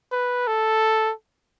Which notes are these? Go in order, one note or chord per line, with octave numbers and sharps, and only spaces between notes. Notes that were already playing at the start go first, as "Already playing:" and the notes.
B4
A4